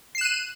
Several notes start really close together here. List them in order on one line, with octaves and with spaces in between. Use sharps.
C7 E7 F#6 D#7